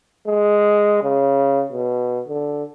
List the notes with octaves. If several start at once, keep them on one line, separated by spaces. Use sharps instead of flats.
G#3
C#3
B2
D3